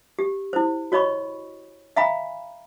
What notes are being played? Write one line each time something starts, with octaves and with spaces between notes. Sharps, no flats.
G4
E4 C5
F#4 C#5 D#5 B5 C#6
E5 F5 G#5 A#5 B5